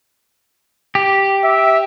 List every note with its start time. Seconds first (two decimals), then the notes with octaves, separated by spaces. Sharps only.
0.95 G4
1.44 E5